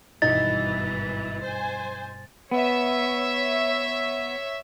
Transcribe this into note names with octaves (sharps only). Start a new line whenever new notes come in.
G#1 G2 B2 E3 D#4 A6
C5 G#5
B3 C#5 E5